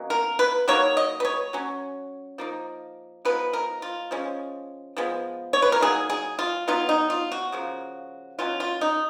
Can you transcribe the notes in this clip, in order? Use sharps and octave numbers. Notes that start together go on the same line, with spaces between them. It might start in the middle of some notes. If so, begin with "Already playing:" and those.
Already playing: B2 F#3 A#3 C#4
A#4
B4
F#3 A#3 D#4 C#5
D#5
B4
C#5
F#3 C#4
F3 A#3 D#4
F3 G#3 B3 D#4 B4
A#4
F4
F3 G#3 C#4
F3 G#3 B3
C#5
B4
A#4
F#3 A#3 D#4 G#4
G#4
F4
F#3 B3 D#4 F4
D#4
F4
F#4
C#3 F3 A#3
B2 F#3 C#4 F4
F4
D#4